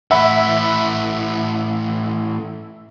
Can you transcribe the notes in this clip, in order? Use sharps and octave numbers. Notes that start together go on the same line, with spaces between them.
A2 E3 E5 F#5 B5